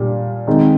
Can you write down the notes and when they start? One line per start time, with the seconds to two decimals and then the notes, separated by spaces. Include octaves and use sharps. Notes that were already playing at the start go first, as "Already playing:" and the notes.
Already playing: A#2 G3 D4 F4
0.47 D#3 G#3 C4 D#4